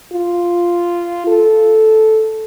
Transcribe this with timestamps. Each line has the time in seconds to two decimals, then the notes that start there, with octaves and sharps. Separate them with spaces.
0.13 F4
1.27 A4